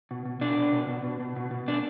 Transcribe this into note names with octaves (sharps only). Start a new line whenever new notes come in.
B2
B2
B2 D4
B2
B2
B2
B2
B2
B2
B2
B2 D4